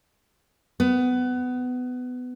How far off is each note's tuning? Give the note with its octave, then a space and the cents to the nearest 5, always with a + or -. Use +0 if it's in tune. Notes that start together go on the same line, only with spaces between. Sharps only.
B3 +20